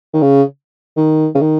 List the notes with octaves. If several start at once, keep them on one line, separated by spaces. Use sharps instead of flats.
D#3
C#3
D#3
C#3
D#3